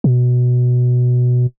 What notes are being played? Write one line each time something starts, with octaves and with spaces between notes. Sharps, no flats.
B2